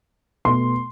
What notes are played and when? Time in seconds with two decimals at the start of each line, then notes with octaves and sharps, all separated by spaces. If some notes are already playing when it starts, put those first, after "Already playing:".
0.45 B2 A3 C6